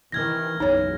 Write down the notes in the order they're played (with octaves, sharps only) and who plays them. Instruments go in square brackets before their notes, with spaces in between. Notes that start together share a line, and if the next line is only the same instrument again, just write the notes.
[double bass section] C3 D#3 E3 [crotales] F6 G#6 A#6
[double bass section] F#1 B1 E2 [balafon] D#4 C#5